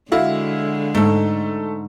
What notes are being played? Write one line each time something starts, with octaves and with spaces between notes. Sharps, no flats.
D3 G#3 E4 F#4 F5
G#2 A3 A4